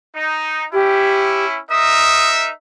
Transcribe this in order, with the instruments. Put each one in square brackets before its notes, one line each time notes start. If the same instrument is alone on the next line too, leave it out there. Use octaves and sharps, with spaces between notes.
[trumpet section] D#4
[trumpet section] C#4 E4 [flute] G4
[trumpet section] D#4 A#4 E5 [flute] D#6